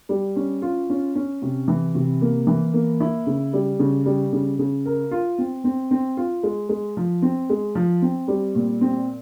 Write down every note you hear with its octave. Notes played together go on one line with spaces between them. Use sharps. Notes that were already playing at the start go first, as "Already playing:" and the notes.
G3
C#4
F4
C#4
C#4
C3
E3
C3
A#3
E3
A#3
E4
C#3
G3
C#3
G3
C#3
C#3
A#4
F4
C4
C4
C4
F4
G#3
G#3
F3
C4
G#3
F3
C4
G3
A#2
C4